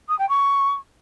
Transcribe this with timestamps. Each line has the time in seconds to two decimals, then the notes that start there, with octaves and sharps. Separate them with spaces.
0.08 D#6
0.19 G5
0.29 C#6